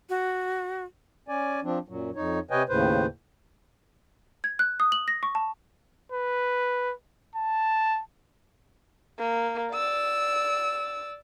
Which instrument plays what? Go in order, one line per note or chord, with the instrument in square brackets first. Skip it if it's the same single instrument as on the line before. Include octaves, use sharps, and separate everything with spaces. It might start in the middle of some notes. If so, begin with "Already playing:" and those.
[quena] F#4
[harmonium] C#4 D5 G#5
F3 C4 D4
F#2 A#2 F#3
F2 D#4 C#5
C3 B4 C#5 D#5 G5 G#5
D#2 A2 C#3 B4 C5
[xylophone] G#6
F#6
D#6
F#7
A#6
C#6
A5
[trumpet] B4
A5
[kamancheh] A#3
D5 E6